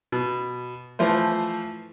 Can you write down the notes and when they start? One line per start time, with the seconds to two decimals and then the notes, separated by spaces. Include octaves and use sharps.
0.12 B2
0.99 E3 F3 A3 C5